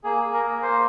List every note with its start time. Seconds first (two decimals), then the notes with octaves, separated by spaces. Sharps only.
0.04 A#3 G#4
0.24 G#4
0.33 A#4
0.43 A#3
0.62 A#3 C5